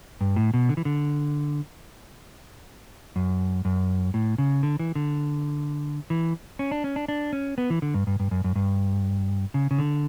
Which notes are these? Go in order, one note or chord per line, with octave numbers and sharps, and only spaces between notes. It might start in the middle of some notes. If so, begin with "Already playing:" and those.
G2
A2
B2
D3
E3
D3
F#2
F#2
A2
C#3
D3
E3
D3
E3
C#4
D4
C#4
D4
D4
C#4
B3
E3
D3
G2
G2
G2
F#2
F#2
G2
C#3
C#3
D3